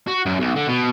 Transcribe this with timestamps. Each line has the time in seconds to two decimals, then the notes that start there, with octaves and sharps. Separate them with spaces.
0.07 F#4
0.26 F#2
0.40 B1
0.56 D3
0.68 B2